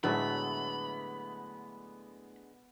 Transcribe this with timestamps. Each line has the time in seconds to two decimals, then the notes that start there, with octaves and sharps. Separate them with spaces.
0.04 A2 D3 F#3 G#3 A3 B3 B5